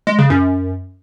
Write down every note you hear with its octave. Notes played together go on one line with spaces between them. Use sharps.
G#3
C#3
F#2